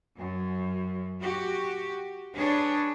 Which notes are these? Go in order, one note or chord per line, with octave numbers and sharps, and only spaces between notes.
F#2
F#4 G4
D4 G#4 B4 C#5